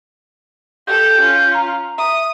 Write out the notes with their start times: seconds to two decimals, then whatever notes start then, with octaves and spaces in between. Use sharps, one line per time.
0.87 G4 A4 G6
1.20 C#4 F4
1.54 A#5
1.98 E5 D#6